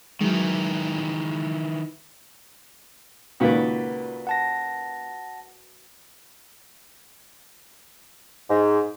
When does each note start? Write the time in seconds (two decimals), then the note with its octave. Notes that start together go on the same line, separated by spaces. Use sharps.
0.21 D#3 E3 F#3 G#3
3.40 C#2 A#2 D#3 F#4 B4 D5
4.27 F#5 A5 A#6
8.50 G#2